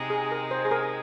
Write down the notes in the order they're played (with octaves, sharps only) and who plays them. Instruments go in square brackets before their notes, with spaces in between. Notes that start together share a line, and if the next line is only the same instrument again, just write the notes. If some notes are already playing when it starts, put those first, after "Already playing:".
Already playing: [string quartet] C3 G#3 D#4
[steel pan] G#4
A#4
C5
G#4
A#4